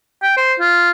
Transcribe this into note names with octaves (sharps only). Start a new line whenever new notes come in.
G5
C5
F4